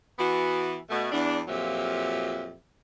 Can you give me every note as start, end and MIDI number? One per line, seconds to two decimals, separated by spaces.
0.18 0.77 52
0.18 0.77 59
0.18 0.77 66
0.90 1.10 47
0.90 1.10 57
1.12 1.40 40
1.12 1.40 62
1.48 2.53 41
1.48 2.53 46
1.48 2.53 53
1.48 2.53 54
1.48 2.53 67
1.48 2.53 76